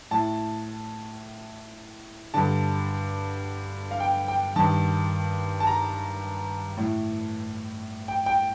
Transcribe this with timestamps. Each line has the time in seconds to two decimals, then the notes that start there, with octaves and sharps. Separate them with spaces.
0.11 A2 A5
2.34 G2 D3 A5
3.91 F5
4.00 G5
4.28 G5
4.56 G2 D#3 A5
5.60 A5
5.67 A#5
6.78 A2
8.08 G5
8.26 G5